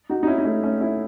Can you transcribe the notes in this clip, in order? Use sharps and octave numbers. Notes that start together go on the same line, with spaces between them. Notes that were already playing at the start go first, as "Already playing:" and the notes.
D#4 F#4
D#4
C#4 E4
D#4
A3 C#4
A3 C#4
C#4 E4